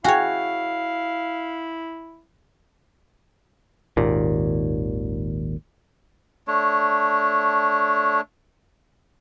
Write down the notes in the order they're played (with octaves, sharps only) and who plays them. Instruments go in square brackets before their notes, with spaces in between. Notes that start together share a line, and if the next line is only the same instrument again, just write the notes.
[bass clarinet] E4 [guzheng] F#4 C#5 [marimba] G#4 G5 G#5 [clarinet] F5
[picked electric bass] G#1 D#2 A#2
[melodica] A3 D4 C#5